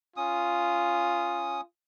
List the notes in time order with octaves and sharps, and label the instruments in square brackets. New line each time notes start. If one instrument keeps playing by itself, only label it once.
[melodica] C#4 D#6 [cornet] F4